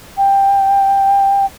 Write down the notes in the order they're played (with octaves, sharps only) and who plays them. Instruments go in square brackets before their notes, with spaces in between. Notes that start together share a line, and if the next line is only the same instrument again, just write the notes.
[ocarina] G5